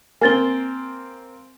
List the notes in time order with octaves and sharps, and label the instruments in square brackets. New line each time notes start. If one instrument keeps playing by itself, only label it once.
[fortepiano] A#3 C4 [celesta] G#5 A6 G7